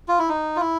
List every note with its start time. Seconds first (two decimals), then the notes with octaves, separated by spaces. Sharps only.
0.08 F4
0.19 E4
0.29 D#4
0.56 F4
0.60 E4